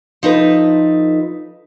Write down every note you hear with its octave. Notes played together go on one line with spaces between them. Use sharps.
F3 D#4 A4 B4